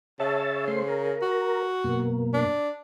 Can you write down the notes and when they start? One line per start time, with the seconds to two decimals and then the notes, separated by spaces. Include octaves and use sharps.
0.20 C#3 C#5 E5 A5
0.68 A3 C5 C6
0.88 A#4
1.22 F#4
1.84 F#2 B2 A#3
2.33 D4